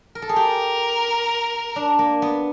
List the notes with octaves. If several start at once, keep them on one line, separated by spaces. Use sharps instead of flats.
A#4
A4
G#4
G4 A#4
D4
A#3
B3